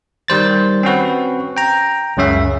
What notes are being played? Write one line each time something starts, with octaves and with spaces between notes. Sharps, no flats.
D#3 G3 C5 A6
C4 C#4 F#4 B4
G5 A#5
C#2 F#2 C#3 C#4 E5